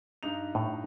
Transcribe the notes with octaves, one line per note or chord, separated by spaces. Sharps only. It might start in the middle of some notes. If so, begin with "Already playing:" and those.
G2 D#4 F7
A2